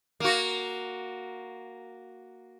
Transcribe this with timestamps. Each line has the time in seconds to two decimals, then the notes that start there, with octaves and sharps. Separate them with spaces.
0.20 A#3 F#4